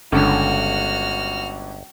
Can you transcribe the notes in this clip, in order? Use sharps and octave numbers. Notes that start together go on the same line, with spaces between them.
G1 C#2 D3 F#4 F6